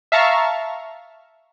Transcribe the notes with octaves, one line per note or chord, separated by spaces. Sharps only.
E5 F5 A5 A#5 C#6 F6